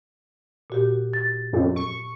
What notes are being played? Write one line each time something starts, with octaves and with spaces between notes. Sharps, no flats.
A#2 F#4 G4
A6
F#2
C#6